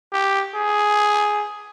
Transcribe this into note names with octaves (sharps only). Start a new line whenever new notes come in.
G4
G#4